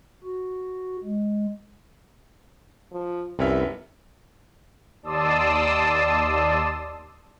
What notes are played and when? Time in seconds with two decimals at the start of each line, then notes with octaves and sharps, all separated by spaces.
0.24 F#4
1.04 G#3
2.91 F3
3.39 F1 C2 B3 C#4 E5
5.03 D#2 D5 A5 C6 D#6 E6